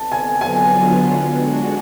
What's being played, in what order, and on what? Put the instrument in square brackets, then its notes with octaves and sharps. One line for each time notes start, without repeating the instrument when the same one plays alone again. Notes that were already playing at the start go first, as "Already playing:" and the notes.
Already playing: [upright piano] A5
G#5
[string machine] D3 F#3 B3 F4 [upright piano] G#5
[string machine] G#3 D4 F#4